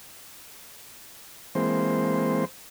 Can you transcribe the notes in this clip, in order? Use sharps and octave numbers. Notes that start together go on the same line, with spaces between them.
E3 G#3 A#3 C4 C5